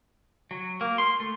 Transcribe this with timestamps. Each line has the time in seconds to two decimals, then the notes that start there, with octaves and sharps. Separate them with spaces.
0.51 F#3
0.81 A#3
0.98 C6
1.20 A3